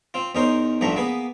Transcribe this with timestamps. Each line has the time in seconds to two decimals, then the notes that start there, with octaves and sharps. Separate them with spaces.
0.14 C4 F4
0.35 E2 C#4 D#4 A#4 C5
0.81 A1 G2 F3 A3 D4 A#5
0.96 A#3 B3 G#4 B4